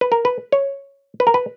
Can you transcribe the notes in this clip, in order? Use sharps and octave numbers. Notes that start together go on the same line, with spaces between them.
B4
A#4
B4
C#5
B4
A#4
B4